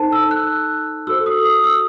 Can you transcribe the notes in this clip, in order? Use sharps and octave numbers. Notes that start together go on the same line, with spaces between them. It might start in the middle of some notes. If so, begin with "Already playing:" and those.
Already playing: D#4 A4 C5 A5
E6
F#6
F#4 A4 C5 E6
D#6
D#6
E6